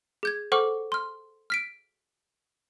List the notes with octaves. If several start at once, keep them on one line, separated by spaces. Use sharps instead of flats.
G#4 G6 G#6
A4 C5 F#5 C#6 D6 F6
C6 F6
F6 B6 D7